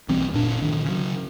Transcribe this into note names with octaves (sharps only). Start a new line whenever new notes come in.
B1 E3 G3 C4
F#1 A#2 D4
C2 D#3
C#3 F#3